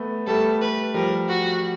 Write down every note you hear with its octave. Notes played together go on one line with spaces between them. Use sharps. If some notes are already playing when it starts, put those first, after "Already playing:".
Already playing: A3 B3
G3 A3 A4
B4
F3 G3 A#4
F#4